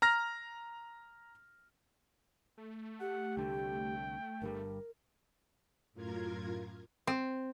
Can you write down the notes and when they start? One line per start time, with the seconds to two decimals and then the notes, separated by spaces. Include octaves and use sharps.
0.02 A#5 F6 A#6
2.57 A3
3.00 G4 F#5
3.37 C2 D3 G5
4.42 G1 G2 G3 A#4
5.93 F#2 A2 F4 A#4 G#6
7.07 C4